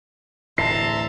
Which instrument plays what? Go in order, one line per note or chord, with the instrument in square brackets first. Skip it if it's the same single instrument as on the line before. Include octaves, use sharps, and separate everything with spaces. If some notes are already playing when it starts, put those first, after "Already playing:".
[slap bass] D1 D2 E3 [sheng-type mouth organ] E5 A#5 C6 [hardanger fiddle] A5 [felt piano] C7